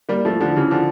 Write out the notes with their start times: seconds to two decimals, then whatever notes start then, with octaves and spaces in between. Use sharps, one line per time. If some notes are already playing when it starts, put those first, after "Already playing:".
0.09 G3 A#3
0.25 F3 A3
0.40 D3 F3
0.56 C#3 E3
0.71 D3 F3